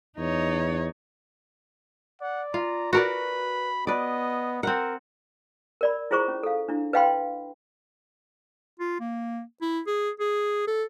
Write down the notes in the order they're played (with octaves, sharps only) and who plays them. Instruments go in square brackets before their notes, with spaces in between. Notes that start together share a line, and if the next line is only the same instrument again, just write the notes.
[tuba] E2 [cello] D#4 C#5
[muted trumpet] D5 [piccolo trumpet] F#5
[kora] F4 [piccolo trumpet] A#5
[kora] F#4 A#4 D5 [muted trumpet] B4 [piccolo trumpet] B5
[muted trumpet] B3 [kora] B4 D5 [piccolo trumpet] D#5
[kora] C4 F#5 [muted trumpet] A#4
[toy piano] A#4 D5 B5
E4 F4 G#4 C5 A#5 C#6
C#4
A4 F5
D4 E4
B4 D#5 F5 G5 B5 C6
[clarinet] F4
A#3
E4
G#4
G#4
A4